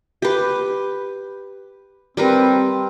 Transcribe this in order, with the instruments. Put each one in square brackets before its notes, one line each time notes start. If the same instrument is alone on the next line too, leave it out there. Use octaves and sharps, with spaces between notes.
[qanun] G4 B4
[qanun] G3 A#4 B4 [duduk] C4